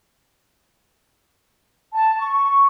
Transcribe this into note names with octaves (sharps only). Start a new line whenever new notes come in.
A5
C#6